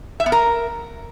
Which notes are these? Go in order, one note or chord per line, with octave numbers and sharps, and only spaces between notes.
E5
B3
A#4